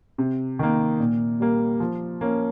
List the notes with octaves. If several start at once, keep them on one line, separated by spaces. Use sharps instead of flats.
C3
D#3 A#3
A#2
G3 A#3
F3
A#3 C#4